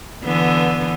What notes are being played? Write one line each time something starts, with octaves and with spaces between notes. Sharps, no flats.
D3 E3 B3